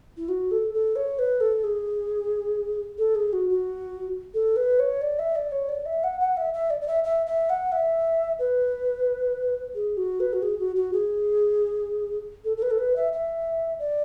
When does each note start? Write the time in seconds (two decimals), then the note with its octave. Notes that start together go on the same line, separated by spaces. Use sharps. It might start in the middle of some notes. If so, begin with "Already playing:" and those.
0.16 E4
0.28 F#4
0.51 A4
0.73 A4
0.95 C#5
1.18 B4
1.40 A4
1.63 G#4
2.98 A4
3.14 G#4
3.32 F#4
3.49 F#4
4.34 A4
4.56 B4
4.79 C#5
5.01 D5
5.18 E5
5.35 D5
5.51 C#5
5.68 D5
5.85 E5
6.03 F#5
6.20 F#5
6.36 E5
6.53 E5
6.70 D5
6.81 D5
6.87 E5
7.03 E5
7.26 E5
7.49 F#5
7.71 E5
8.39 B4
9.75 G#4
9.97 F#4
10.19 B4
10.33 F#4
10.42 G#4
10.58 F#4
10.75 F#4
10.92 G#4
12.44 A4
12.57 A4
12.62 B4
12.70 A4
12.78 B4
12.95 E5
13.12 E5
13.79 D5